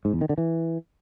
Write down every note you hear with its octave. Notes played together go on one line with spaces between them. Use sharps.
G#2
E2
D#3
D3
E3